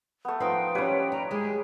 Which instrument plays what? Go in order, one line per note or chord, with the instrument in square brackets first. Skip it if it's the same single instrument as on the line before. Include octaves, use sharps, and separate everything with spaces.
[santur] A3 B3
[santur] F3 D#4 C6 [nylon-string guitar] B4 [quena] G5
[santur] G3 B4 C#5 [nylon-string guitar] C#4 D#4
[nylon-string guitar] G4 [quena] A#5
[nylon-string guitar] G#3 G4 [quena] G#4